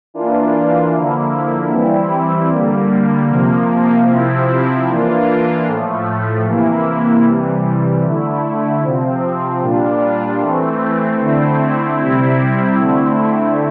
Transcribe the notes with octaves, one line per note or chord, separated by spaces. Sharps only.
E3 A#3 D4 F4
D3 F3 A#3 E4
E3 G3 C4 E4
D3 G3 A#3
C3 F3 A#3
C3 F3 C4 E4
E3 A#3 D4 F4
A2 F3 A3
C3 E3 A#3 E4
C3 E3 G3
D3 A3 E4
C3 F3 C4
A#2 G3 D4 F4
E3 A3 C4
D3 A3 C4 E4
C3 G3 C4 E4
D3 A3 C4 E4